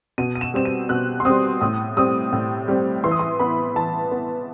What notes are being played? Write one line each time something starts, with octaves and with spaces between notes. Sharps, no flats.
B2 D#7
D#7
E7
G3 C4 E7
D#7
B2 F#6
C6
G3 C4 D#6
A2 D#6
G3 C4 D#6
A2
G3 C4
E3 C6
D#6
C6
B3 B5
E3 A5
B3